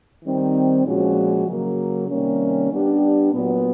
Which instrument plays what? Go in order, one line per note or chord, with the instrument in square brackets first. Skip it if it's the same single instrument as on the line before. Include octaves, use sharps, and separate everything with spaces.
[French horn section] D#3 G3 C4
A#2 F3 G#3 C#4 F#4
C#3 F#3 A#3
C3 D#3 G3 A#3 C#4
G3 B3 D4 G4
A#2 F#3 B3